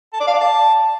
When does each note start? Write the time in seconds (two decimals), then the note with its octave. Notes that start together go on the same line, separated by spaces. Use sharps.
0.13 A5
0.20 D5
0.27 F5
0.34 D5
0.41 A5